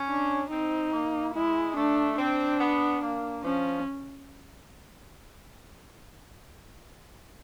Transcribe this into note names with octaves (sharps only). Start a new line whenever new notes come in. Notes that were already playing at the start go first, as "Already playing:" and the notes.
Already playing: C#4
D4
C4 D#4
A#3
G#3 E4
A3 D4
C4 D4
B3
A#3
F3 C#4